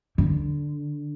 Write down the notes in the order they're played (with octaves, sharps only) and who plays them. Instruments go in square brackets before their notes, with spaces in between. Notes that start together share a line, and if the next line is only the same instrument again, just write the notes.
[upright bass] D3